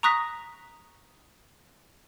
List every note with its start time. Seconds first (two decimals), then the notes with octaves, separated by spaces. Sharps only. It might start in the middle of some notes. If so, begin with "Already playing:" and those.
0.03 A#5 C#6 D#6 F#6 A#6 B6